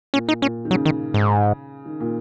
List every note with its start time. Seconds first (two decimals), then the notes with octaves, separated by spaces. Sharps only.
0.14 A#2 C#4
0.28 D#4
0.42 A#2 C#4
0.65 D#3
0.71 C#3 F#3
0.85 D#3
1.14 G#2
1.86 D#3
2.00 A#2